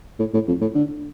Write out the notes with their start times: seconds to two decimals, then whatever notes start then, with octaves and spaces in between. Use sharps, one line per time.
0.19 A2
0.34 A2
0.48 F2
0.61 A2
0.75 D3